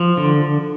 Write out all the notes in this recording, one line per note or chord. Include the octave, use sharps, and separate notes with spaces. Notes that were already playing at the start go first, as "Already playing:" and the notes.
Already playing: F3
D3